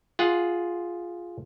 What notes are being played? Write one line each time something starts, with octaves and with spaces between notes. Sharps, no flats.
F4 G#4 F#5